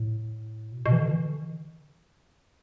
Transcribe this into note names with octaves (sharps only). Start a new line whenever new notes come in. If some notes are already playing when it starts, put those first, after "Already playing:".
Already playing: A2
B2
B2
E3
D3
E3
D3